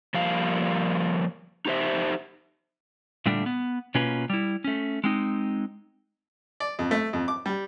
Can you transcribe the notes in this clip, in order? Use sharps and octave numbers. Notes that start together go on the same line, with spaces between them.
F3 G3 A#3 F5
D#4 G4 C5 E5
A#2 D3 G3 A3 D4
B3
B2 A#3 C#4 F4 B4
G3 E4
A3 C#4
G#3 C4 D#4
D5
F2
A3
F2
D6
G3